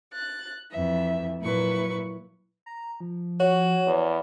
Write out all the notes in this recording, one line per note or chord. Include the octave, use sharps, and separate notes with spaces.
F#6 A6
F2 E3 E5
A#2 F#3 E4 B4 C#6
A#5
F3
F#4 C#5
E2